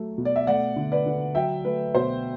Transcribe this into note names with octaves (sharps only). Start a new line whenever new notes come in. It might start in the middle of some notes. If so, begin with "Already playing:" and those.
Already playing: F#3 A3
B2
D5
E5
A3 D5 F#5
D3
B4 D5
D3
F#3 E5 G5
A3 B4
B2 C5